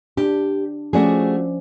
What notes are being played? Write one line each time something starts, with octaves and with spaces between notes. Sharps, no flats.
D4 G4
F3 A3 C#4 F#4 G#4 D5